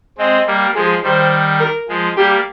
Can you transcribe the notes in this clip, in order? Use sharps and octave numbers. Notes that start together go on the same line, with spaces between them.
G#3 C4 D#5
G3 A#3
F3 G#3 G#4
D#3 G3 C5
A#4
F3 G#3
G3 A#3 G4